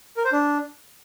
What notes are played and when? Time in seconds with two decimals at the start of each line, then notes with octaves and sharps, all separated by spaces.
0.17 A#4
0.25 C5
0.32 D4